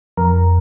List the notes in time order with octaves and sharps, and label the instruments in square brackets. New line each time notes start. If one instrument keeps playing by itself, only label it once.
[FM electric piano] F2 A#4